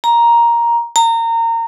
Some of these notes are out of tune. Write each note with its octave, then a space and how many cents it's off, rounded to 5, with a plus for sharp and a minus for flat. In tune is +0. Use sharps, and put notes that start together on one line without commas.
A#5 +10
A#5 -25